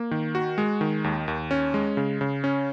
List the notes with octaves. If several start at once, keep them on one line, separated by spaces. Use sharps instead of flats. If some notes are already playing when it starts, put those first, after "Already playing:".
Already playing: A#3
D#3
F#4
G#3
D#3
D#2
D#2
C#4
G#3
C#3
C#3
C#4